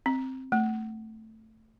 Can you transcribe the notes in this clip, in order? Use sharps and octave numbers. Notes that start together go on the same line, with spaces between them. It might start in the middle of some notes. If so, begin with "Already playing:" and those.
C4
A3